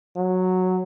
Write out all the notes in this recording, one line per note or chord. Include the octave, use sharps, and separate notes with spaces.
F#3